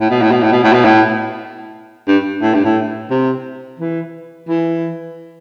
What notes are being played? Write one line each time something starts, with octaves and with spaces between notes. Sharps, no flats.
A2
B2
A2
B2
A2
B2
A2
B2
A2
G2
A2
G2
A2
C3
E3
E3